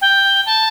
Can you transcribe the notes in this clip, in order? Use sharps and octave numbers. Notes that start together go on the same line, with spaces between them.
G5
A5